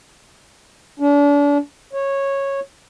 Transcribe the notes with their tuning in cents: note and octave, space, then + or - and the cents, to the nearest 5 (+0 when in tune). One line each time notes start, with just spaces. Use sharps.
D4 -35
C#5 -10